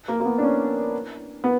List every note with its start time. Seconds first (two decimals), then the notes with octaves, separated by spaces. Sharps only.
0.08 A#3
0.20 A#3
0.25 B3
0.38 D4
0.43 C#4
1.44 B3